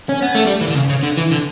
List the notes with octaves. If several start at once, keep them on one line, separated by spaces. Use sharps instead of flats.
C#4
B3
A3
G3
E3
D3
C#3
C#3
D3
E3
D3